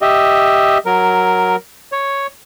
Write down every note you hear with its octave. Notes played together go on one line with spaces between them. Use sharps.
G4 D#5 E5
F#3 A#4
C#5